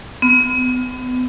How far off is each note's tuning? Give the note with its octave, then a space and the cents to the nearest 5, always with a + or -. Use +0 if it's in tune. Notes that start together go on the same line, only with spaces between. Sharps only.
B3 +35